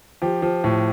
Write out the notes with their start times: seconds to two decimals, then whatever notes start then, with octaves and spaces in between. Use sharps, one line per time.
0.22 F3 G4
0.42 F3
0.64 A2